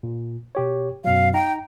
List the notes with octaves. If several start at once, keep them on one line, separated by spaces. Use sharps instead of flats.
A#2
B2 G4 C#5
F#2 B2 F#3 F5
D#4 G5 A#5